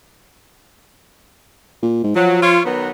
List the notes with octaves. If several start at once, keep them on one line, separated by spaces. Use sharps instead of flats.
A#2
G#2
F3 F#3
F4 C#5
D#3 F#3 B3